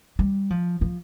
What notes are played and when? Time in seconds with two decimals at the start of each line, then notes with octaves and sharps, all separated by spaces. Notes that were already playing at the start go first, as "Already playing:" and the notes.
0.19 G3
0.50 F3
0.81 F3